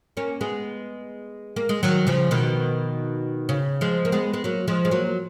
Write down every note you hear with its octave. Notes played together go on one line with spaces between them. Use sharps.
A#3 C#4
G#3 B3
A#3
G#3
D#3 F#3
C#3 F3
B2 D#3
C#3
F3 G#3
A#3
G#3 B3
G#3
F#3 A#3
F3 G#3
G#3
F#3 A#3